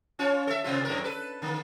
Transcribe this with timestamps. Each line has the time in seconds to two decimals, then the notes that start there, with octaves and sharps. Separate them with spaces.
0.19 C#4 F4 C#5
0.47 A4 E5
0.64 C3 C4 F4
0.85 F#2 A2 A#4
1.04 A4 B4
1.42 D3 A#3